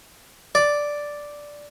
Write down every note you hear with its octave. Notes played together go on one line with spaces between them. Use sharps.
D5